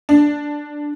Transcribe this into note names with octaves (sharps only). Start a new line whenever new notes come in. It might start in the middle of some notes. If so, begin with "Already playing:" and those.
D4